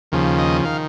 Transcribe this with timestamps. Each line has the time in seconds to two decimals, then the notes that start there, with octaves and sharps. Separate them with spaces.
0.12 D#2 C#3 F3
0.39 D#5
0.65 D#3 F5